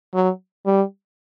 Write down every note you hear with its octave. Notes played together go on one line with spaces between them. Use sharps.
F#3
G3